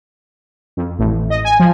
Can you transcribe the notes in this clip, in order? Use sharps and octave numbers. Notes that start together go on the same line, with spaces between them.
F2
A1
D#5
G#5
F3